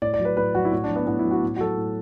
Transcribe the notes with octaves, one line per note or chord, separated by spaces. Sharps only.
A2 D5
D5
F#3
B4
A2 B4
F#3 F#4
E4
A2 F#4
D4
F#3
B3
A2 B3
E4
F#3
F#4
A2
F#4
F#3 A4
A2